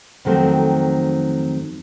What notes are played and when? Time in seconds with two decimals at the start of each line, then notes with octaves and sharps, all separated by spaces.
0.25 F2 D#3 F#3 A3 C4